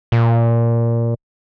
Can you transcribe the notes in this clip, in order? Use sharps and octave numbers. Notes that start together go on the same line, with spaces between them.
A#2